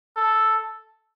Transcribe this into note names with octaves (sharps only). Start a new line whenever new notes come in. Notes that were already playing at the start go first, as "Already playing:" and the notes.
A4